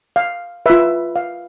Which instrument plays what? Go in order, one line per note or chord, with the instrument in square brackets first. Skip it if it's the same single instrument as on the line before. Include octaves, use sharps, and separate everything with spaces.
[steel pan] F5
F4 B4 E5
F5